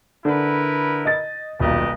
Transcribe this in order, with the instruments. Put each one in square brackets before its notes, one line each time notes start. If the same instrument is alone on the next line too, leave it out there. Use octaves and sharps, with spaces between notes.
[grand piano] D3 [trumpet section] E4 A#4 B4
[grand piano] D#5 A6
[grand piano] D#1 B1 [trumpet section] G4 B4 D#5